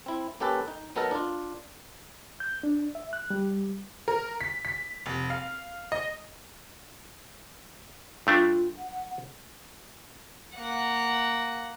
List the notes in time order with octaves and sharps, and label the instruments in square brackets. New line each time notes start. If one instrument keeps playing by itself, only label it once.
[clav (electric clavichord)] C4 E4
A#3 C#4 G4 A4 B4
D#4
F#3 B3 D#4 A4 A#4 D#5
D4 F4
[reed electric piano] G6
D4
E5
F#6
G3
[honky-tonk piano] A#4
B6
B6
F1
F5
D#5
[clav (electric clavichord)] G2 A3 D4 [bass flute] F4
[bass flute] F#5
[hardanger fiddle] A#3 F#5